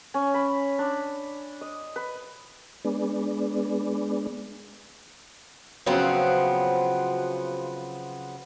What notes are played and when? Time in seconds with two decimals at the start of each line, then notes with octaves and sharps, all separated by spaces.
0.14 C#4
0.34 B5
0.79 D4
1.61 D#5
1.96 B4
2.85 G#3 B3 D4
5.86 C#3 F3 F#3 B3 C4